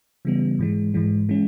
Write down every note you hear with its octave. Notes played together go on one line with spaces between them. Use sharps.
C#3 E3 G3 B3
G#2 E3 G#3
G#2 E3 G#3
E3 G#3 C#4